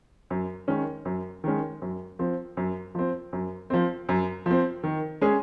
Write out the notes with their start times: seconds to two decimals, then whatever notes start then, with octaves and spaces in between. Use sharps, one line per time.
0.30 F#2
0.68 D#3 G#3 C#4
1.05 F#2
1.44 D#3 G#3 C#4
1.82 F#2
2.19 F3 C4
2.57 F#2
2.95 F3 C4
3.33 F#2
3.70 F3 C4
4.09 F#2
4.46 F3 C4
4.84 D#3
5.21 G#3 C#4 G#4